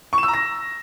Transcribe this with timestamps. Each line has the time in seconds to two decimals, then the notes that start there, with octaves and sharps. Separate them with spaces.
0.13 C#6
0.18 E7
0.23 E6
0.28 A#5
0.33 A#6